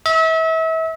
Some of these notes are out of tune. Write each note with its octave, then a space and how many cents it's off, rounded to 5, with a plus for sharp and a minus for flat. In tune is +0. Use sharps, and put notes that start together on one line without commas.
E5 -35